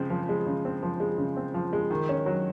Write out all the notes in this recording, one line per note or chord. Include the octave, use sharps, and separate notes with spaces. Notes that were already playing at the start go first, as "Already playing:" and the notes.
Already playing: C#3 F3 G#3 C4
F3
G#3
C#3
C4
F3
G#3
C#3
C4
F3
G#3
D#3
C#4
F#3